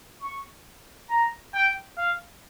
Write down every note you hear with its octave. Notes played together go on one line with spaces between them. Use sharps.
C#6
A#5
G5
F5